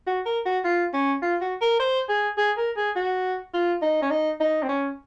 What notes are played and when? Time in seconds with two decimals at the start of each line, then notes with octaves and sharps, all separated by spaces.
0.07 F#4
0.26 A#4
0.46 F#4
0.64 F4
0.93 C#4
1.22 F4
1.41 F#4
1.61 A#4
1.80 C5
2.09 G#4
2.38 G#4
2.58 A#4
2.77 G#4
2.96 F#4
3.54 F4
3.82 D#4
4.02 C#4
4.10 D#4
4.40 D#4
4.63 C4
4.69 C#4